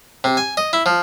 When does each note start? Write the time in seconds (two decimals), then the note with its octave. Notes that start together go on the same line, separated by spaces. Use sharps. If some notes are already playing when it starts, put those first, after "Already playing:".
0.24 C3
0.37 G#5
0.57 D#5
0.73 E4
0.86 F3